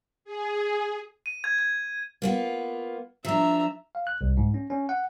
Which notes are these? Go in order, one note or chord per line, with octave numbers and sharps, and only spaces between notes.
G#4
D#7
G#6
G#6
A#3 B3 F4
F3 D4 E5 A#5
F5
F#6
C2
G#2
C#4
C#4
F#5